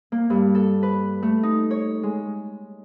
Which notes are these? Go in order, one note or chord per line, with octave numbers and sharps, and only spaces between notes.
A#3
G2
A4
B4
A3
D#4
C#5
G#3